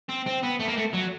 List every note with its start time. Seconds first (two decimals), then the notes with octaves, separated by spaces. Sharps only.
0.09 C4
0.27 C4
0.43 B3
0.61 A3
0.69 A#3
0.78 A3
0.94 F#3